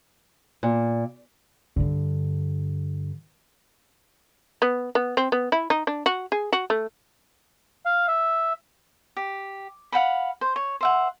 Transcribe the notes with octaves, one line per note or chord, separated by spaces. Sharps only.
A#2
G2 D3
B3
B3
C4
B3
E4
D#4
D4
F#4
G#4
F#4
A3
F5
E5
G4
F5 F#5 A5 B5
C5
C#5
C5 E5 F#5